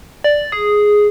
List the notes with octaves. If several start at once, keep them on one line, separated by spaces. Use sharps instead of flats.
D5
G#4